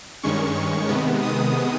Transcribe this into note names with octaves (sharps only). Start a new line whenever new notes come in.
G2 D#3 G#3 C#4 C#6
C3 D#3 G#3 B3
D#6